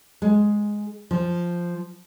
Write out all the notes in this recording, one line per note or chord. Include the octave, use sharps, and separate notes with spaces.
G#3
F3